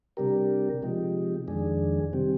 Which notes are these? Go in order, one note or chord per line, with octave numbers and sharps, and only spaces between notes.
C3 G3 D4 G4 A#4
C3 F3 G#3 D#4 G4
F2 D#3 G#3 D4 G#4
C3 D#3 G3 C4 G4